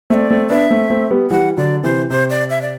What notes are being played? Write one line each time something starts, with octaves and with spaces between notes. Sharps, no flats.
A3 C4 D5 E5
A3 C4
B3 D4 E5
A3 C4
A3 C4
G3 B3
E3 G3 F#5
D3 F#3 D5
C3 E3 C5
C3 C5
D5
E5
D5